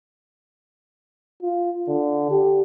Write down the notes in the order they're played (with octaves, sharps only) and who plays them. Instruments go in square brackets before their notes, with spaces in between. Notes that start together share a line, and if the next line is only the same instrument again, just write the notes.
[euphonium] F4
D3
G4